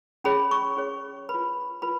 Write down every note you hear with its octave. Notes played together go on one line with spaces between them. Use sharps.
C#4 G#4 C#5 B5
C#6
C#4 G#4 C#5
B4 B5
F4
F4 B4 B5